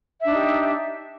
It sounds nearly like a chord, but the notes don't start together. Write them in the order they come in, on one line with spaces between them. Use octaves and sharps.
E5 D4 D#4 G4